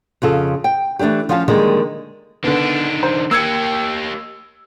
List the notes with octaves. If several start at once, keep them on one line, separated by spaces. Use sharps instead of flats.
F2 C#3 F4 A4
G5
E3 A3 A#3 D4 G4
F3 C#4 F4 F5 F#5 A5
D3 D#3 F3 G3 G#3 A#3
D3 D#3 B3 D4
C5
A#3 G4 E6 G#6 C#7